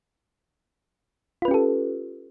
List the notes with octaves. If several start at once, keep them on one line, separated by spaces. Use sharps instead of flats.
C#4 F4 G4 A4 B4